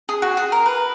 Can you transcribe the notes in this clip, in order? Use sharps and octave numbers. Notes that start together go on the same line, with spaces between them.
G#4
F#4
G#4
A#4
B4